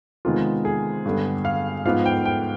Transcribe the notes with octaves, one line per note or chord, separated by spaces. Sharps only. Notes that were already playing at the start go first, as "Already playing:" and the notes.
C3 D#3 G#3 B3 F4
G#4
G2 D3 G3 B3
F5
G#2 F3 B3 F5
G5
G5